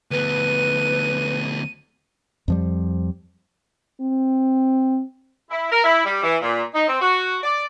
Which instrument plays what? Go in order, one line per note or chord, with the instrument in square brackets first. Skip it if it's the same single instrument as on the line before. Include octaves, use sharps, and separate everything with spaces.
[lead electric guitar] D2 B3 [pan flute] B4 [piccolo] D#7
[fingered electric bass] F2 F3 G3
[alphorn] C4
[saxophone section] E4
A#4
E4
G3
E3
A#2
D#4
C4
F#4
D5